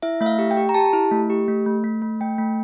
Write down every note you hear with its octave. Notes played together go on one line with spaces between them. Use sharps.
E4 E5
A3 E5
F5
G4
G5
G4
A#5
G4 A5
E4
A3
G4
A3
A3
A3
A3
A3 G5
A3